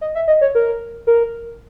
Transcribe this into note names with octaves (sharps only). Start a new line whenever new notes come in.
D#5
E5
D#5
C#5
A#4
A#4